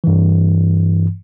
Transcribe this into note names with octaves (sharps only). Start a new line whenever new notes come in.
G2 E3